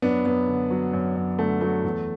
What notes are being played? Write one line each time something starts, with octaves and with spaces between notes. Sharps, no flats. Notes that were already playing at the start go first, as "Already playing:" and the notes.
F#2 B3 D4
F#2 B3
D3
F#3
F#2
F#2
D3 A3
F#3 A3
E2